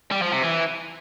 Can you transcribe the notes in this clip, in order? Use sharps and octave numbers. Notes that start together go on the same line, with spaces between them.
G3
F3
C3
E3